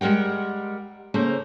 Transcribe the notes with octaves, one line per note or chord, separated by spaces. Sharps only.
G3 G#3 A#4 F#5 G5
C#3 A3 A#3 C5 A#5